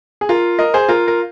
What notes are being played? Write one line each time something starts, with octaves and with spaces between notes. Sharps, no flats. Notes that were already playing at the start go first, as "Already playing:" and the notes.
G#4
F4 A#4
A#4 D#5
G#4 C5
F4 A#4
A#4